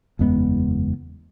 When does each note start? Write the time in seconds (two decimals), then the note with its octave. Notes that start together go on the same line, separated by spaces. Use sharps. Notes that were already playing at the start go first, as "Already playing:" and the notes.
0.19 F#1 E2 G#3 B3